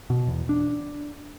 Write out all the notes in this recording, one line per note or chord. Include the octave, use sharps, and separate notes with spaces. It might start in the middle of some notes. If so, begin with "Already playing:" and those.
B2
E2
D4